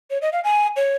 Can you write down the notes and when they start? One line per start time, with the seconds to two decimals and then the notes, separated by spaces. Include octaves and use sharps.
0.10 C#5
0.22 D#5
0.33 F5
0.44 G#5
0.76 C#5